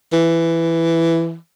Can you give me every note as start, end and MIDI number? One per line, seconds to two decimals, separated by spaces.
0.13 1.36 52